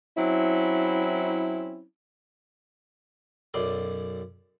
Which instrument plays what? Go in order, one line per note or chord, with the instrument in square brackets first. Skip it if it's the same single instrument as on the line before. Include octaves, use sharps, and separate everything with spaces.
[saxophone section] F#3 C4 C#4 E4
[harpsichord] B1 F#2 D5 C6